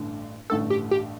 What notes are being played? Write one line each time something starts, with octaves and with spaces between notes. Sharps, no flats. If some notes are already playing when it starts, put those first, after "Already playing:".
Already playing: A1 G2 D3 A3 D4
A1 G2 D3 A3 D4 A4
G4
G4